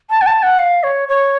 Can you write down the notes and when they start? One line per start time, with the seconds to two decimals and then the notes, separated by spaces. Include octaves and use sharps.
0.10 A5
0.21 F#5
0.26 A5
0.43 F#5
0.59 F5
0.83 C#5
1.08 C#5